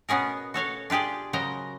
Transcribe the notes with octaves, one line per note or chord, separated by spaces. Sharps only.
B2 B3 C#4 G#4 A#4
F#4 A4 C#5 F5
D4 F4 G4 G#4 D5
C#3 F#3 A#4 C5 D#5 A#5